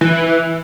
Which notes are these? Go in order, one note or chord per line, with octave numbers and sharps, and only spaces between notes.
E3